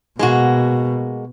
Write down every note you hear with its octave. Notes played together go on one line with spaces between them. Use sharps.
B2 G#3 A#3 F#4